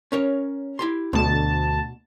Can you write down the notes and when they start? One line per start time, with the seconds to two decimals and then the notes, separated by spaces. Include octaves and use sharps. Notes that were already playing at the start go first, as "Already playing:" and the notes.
0.12 C#4 A#4 C#5
0.79 E4 G4 C6
1.13 D2 B2 A5